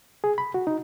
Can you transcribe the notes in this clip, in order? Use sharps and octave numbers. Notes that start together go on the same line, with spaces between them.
G#4
B5
F#4
D#4